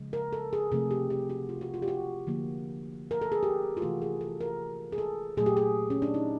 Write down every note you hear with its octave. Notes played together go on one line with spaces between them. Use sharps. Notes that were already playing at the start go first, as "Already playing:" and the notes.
Already playing: C#3 F3 G#3
A#4
A4
G#4
C3 F3 A3 G#4
G4
G4
F#4
F4
F#4
F4
G4
F#4
D3 F3 A#3
A#4
A4
G#4
G4
F4
C3 E3 A3 F#4
G#4
A4
A#4
G#4
A4
A#2 F#3 A3 G#4
G4
G#4
C#4
D4
D#4